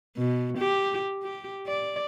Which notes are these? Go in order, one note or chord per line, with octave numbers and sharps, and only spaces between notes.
B2
G4
G4
D5